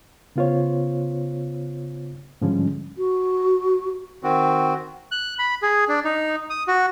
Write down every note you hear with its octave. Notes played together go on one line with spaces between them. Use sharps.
C#3 B3 F4 C5 C#5
G#2 D3 F3 G3 G#3 C#4
F#4
D#3 C4 F#4
F#6
B5
G#4
D4
D#4
D#6
F#4